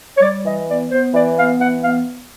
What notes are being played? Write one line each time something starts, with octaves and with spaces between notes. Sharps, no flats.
C#5
G3 D5
E3 D#5
B3 D5
B3 C5
E3 D5
B3 F5
E3 F#5
B3 F5